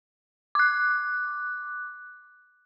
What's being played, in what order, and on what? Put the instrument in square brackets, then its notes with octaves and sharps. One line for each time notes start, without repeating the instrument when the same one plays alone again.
[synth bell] D6 F#6